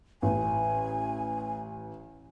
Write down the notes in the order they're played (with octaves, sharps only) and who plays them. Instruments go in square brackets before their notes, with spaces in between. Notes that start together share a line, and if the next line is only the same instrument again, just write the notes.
[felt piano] A1 [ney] G#5